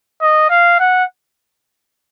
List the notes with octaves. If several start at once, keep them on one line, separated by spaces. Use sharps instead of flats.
D#5
F5
F#5